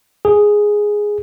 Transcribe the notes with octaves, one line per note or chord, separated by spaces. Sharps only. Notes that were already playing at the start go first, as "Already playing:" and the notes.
G#4